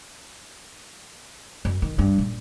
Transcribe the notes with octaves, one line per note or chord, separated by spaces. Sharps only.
F#2
D#3
G2
A#2